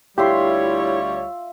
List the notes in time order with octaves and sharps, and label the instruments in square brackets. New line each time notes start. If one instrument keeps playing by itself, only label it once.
[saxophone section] D2 G3 C#5 [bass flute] E4 [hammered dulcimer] F4 E5 C6 [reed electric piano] G4